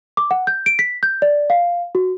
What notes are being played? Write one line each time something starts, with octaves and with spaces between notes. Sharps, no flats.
D6
F#5
G6
D7
B6
G6
D5
F5
F#4